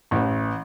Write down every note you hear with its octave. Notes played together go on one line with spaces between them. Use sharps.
A1